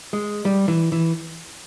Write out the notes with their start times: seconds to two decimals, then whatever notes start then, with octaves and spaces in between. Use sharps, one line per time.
0.13 G#3
0.45 G3
0.68 E3
0.92 E3